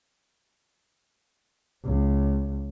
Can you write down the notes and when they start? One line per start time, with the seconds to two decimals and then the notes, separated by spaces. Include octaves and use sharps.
1.84 C#2